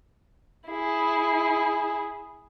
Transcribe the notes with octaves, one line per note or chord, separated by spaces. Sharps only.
E4 G#4